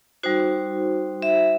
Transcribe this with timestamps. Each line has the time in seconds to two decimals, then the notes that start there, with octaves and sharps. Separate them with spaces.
0.23 G3 D#4 F#4 C5
1.22 E5